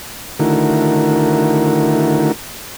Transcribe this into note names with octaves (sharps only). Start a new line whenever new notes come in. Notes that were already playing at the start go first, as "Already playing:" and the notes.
D3 D#3 A3 E4 F#4 A#4